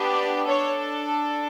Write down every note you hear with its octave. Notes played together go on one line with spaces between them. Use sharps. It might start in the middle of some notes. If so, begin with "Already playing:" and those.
Already playing: B3 D4 G4
D5
D4 A4 C#5